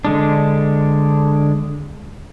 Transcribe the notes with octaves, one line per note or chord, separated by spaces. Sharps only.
D3 G#3 D4